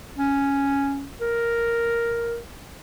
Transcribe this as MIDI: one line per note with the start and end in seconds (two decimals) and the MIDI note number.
0.18 1.07 61
1.21 2.37 70